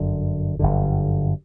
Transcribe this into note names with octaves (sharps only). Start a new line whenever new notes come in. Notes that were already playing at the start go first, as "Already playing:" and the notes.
Already playing: G1 F#2 D3
G1 F#2 D3